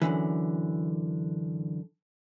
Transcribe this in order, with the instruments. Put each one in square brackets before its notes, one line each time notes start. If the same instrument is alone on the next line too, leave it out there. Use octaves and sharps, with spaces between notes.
[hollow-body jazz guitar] F#2 B2 D3 E3